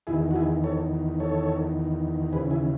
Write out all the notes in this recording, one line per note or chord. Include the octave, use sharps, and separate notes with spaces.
E2 D#3 E4 G#4
F#4
E4 G#4
A4 C#5
A4 C#5
D#2 C#3 E3 G#4 B4
E4 G#4